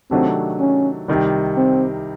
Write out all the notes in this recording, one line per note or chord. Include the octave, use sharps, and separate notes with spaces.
C3 D#3 F#3 A3 C4 D4
C#4
C2 C3 D#3 G3
C4